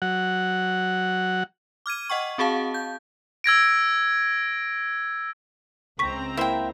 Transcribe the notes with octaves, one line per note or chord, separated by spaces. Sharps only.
F#3 F#5
D6 F6 G#6 D#7
D#5 F#5 G5 C#6
C4 F#4 G#4 F5 A5
G6
E6 G#6 A#6 D7
C#2 C4 A#5 C#6 B6
A#3 E4 C5 E5 G5